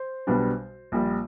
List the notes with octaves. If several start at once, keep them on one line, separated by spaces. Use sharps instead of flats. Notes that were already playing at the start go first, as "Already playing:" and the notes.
Already playing: C5
B1 B2 G3 B3 D4
A#1 A#2 G3